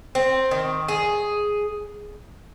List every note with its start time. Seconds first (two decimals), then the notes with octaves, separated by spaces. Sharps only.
0.15 C4
0.51 D#3
0.88 G#4